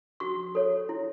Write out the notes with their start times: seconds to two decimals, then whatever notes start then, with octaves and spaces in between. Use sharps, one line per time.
0.20 F#4 C#6
0.55 A4 C#5
0.89 E4